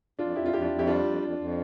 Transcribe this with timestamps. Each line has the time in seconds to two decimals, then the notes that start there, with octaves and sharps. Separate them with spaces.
0.19 F2 D4 F4
0.36 F2 E4 G4
0.46 F4
0.53 F2 E4 G4
0.62 D4 F4
0.70 F2
0.79 E4 G4
0.87 G3 D4 F4
1.04 F2
1.22 F2
1.38 F2